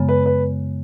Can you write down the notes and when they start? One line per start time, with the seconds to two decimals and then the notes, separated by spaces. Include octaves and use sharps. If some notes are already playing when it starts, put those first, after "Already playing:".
Already playing: F#2 C#3 G#3 B3
0.09 B4
0.26 B4